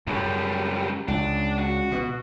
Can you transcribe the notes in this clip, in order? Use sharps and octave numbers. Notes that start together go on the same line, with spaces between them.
C#2 F#2 G3
C#2 D4
F#4
B2